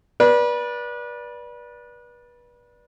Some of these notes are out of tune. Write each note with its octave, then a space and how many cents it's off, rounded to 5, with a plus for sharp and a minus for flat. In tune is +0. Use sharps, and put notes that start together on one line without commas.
B4 -30 D5 +0